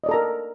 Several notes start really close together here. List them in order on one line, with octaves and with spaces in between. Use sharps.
D#5 D5 A4 A#5 A#4